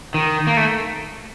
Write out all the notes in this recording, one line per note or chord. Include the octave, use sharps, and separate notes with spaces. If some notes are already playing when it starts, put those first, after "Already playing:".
D#3
A#3
A3